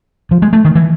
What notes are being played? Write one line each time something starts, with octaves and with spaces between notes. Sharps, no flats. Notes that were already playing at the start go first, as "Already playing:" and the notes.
F3
G#3
A3
D#3
E3